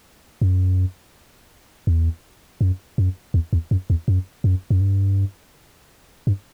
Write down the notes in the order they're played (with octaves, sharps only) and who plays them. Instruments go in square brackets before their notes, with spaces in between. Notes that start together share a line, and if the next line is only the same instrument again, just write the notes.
[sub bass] F#2
E2
F#2
F#2
E2
E2
F#2
E2
F#2
F#2
F#2
G2
G2